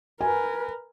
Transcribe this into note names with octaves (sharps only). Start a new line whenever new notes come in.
A#4 B4 G#5